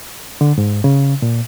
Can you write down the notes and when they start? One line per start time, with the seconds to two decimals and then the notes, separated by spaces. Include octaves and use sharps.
0.41 D3
0.58 G#2
0.84 C#3
1.22 A#2